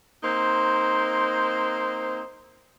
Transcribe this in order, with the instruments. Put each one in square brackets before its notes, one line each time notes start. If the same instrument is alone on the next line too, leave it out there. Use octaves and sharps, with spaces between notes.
[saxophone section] A#3 C4 D#4 C5